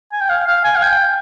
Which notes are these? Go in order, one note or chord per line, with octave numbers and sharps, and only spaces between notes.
G#5
G5
F5
F5
G#5
F5
G5